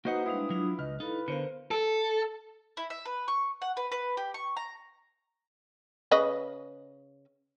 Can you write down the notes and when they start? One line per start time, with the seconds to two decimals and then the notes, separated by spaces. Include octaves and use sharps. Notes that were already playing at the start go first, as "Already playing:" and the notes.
0.05 A#3 D#4 F#4 B4 C5 D#5 F#5
0.26 G3 G#3 D4 E4 B4 F5 D#6
0.50 F#3 D4 F4
0.79 C#2 B4 D#5 F6
1.00 D#4 E4 A4 B4 F5
1.28 D3 B3 A#4 C5 F5 C#7
1.71 A4
2.77 E4
2.90 E5
3.05 B4
3.28 C#6
3.62 F#5
3.77 B4
3.92 B4
4.17 G4
4.34 C#6
4.57 A#5
6.11 C#3 B4 D#5